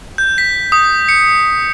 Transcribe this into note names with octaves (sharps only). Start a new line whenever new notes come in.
G6
B6
D#6
C#7